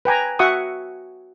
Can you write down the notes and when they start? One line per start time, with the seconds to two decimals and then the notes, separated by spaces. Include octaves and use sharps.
0.05 B4 G5 G#5 A#5
0.39 F#4 E5 F#5 C#6 D#6